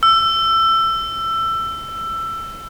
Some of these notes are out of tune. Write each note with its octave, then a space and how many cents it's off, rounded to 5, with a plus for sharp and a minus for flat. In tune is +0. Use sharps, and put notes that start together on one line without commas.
E6 +20